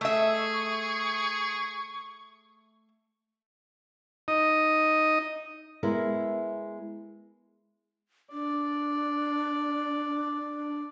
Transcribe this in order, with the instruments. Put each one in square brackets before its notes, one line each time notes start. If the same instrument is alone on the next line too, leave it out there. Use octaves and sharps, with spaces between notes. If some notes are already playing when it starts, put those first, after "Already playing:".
[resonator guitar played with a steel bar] A3 E5 [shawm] G#4 [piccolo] C#6
[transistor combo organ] D#4 D#5
[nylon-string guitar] G#3 B3 E4 A#4
[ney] D4 [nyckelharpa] D5